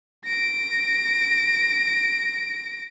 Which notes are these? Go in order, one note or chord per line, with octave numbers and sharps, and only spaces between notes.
A#6 D7